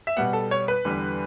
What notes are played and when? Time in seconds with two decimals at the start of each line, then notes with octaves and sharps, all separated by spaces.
0.07 E5
0.17 B2 G3 B3 F#5
0.33 A4
0.51 C#5
0.68 B4
0.85 E2 D3 G3